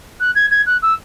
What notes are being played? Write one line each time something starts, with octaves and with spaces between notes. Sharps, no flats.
F#6
G#6
G#6
F#6
E6